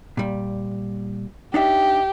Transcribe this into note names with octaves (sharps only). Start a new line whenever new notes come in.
A#2 G3
D4 D#4 G4 E5